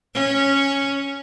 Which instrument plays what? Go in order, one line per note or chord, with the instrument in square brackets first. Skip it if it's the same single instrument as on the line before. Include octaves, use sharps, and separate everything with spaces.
[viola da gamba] C#4